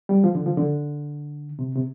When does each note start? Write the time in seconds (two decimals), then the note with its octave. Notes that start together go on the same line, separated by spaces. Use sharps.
0.09 G3
0.24 F3
0.35 D3
0.46 F3
0.57 D3
1.59 C3
1.75 C3